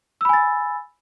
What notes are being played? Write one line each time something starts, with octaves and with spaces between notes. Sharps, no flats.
G#5 B5 E6 A6